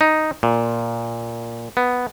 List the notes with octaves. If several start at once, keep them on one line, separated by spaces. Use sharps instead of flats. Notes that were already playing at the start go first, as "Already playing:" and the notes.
D#4
A#2
B3